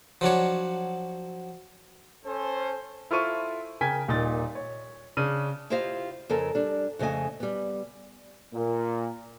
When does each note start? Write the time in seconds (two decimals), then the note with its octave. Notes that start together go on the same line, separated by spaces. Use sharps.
0.21 F3 F#3 D4 C#5
2.25 C#4 A4 C5
3.11 E4 F4 A4 C5 C#6 D#7
3.81 C#3 A#4 G5 G#5 G#6 B6
4.08 D#1 A#2 D#4 A6
4.55 C#5
5.17 C#3 D4 D#7
5.70 E4 F4 G4 C5 D#5 F5
6.29 F2 C#3 A4 A#4
6.55 G3 D4
6.99 F2 C#3 A3 D#5 G#5
7.40 G3 B3
8.54 A#2